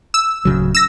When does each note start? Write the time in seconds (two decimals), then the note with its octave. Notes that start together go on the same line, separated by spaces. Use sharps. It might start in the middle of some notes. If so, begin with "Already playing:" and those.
0.14 E6
0.45 D1 C#3 F#3
0.75 E6 A#6